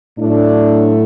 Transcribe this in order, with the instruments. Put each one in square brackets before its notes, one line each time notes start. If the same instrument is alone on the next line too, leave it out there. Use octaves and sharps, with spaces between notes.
[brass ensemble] A2 F#3 A3 D4